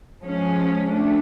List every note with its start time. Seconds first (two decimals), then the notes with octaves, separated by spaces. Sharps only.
0.21 F3 G#3 C#4
0.90 A3 D4